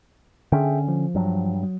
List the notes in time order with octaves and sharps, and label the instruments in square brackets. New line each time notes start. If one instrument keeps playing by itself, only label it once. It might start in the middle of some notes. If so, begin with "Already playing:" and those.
[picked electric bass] D3 C#4 [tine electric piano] G#4 E5 G5
[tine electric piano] F3
[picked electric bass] G2 F#3
[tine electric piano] F#3